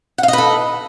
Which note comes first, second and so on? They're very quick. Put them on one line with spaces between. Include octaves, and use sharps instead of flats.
F#5 F5 D#5 B4 A4